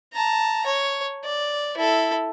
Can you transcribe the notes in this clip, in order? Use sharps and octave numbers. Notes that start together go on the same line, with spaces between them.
A5 A#5
C#5
D5
E4 A4